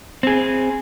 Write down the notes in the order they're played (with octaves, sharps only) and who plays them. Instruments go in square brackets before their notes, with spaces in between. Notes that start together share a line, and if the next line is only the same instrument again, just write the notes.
[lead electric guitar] C4 G#4